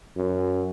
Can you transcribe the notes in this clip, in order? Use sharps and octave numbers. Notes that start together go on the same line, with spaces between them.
F#2